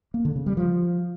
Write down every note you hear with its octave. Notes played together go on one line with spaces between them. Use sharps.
A#3
D3
C#3
G3
F3